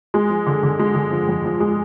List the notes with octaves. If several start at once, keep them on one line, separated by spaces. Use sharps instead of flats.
G#3
F3
D3
D3
G#3
D3
F3
F2
F3
G#3